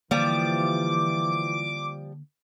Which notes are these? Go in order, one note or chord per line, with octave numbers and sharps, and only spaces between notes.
D3 E3 F3 G3 A#3 D6